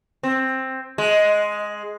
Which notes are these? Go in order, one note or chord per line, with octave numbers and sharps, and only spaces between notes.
C4
G#3